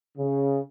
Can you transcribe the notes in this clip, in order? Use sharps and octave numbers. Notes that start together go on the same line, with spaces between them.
C#3